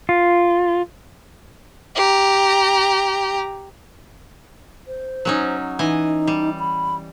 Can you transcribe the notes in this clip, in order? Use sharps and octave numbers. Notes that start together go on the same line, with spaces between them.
F4
G4 A#5
C5
F#3 C#4 D#4
E3 D#4 D#5 G#5
G3
B5